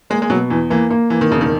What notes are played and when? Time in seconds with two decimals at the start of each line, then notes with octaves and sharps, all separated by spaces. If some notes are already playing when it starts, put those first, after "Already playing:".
0.10 G#3 A#3
0.22 G#3
0.30 B2 F#3
0.50 E2 E3
0.70 E3 A#3
0.90 A#3
1.10 E3 A#3
1.21 D#3
1.31 E1 C#3
1.41 D#3